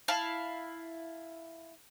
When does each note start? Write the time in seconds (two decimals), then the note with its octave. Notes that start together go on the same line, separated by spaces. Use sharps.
0.08 E4 F5 A5